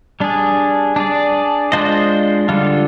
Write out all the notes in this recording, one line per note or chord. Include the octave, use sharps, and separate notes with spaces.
G3 D4 G#4
D4 G#4 D5
G#3 D4 F4 C5 D#5
D3 G3 D4 F4